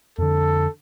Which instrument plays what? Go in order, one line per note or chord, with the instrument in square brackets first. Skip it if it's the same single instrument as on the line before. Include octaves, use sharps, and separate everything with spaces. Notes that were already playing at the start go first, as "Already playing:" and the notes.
[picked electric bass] F2 D3 [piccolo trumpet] A4